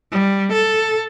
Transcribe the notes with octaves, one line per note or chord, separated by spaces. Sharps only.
G3
A4